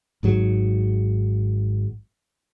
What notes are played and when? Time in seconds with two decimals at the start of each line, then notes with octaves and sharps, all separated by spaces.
0.23 G#1 G#2 F#3